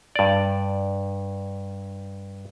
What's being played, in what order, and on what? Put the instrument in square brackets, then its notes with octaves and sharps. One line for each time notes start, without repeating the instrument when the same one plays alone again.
[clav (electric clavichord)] G2 D5